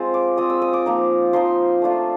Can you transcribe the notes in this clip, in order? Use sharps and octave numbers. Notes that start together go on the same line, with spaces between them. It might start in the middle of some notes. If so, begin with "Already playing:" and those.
Already playing: G#3 C4 F4
D6
G#3 C4 F4 D#6
E6
D#6
D6
F3 A#3 D#4
F3 A#3 D#4 C6
A3 D4 F4